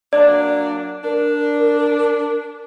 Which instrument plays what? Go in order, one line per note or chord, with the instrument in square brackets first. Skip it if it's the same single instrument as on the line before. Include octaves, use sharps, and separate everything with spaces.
[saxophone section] F#3 A#3 D4 [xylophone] D5
[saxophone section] D4 [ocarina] A#4